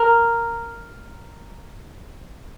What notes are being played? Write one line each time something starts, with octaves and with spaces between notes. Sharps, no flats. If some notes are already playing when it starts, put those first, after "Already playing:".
Already playing: A#4